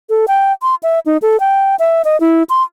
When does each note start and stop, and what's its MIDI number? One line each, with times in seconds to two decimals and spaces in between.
0.10 0.25 69
0.28 0.52 79
0.62 0.75 84
0.83 0.99 76
1.06 1.17 63
1.22 1.39 69
1.40 1.76 79
1.79 2.02 76
2.05 2.19 75
2.20 2.43 64
2.50 2.63 84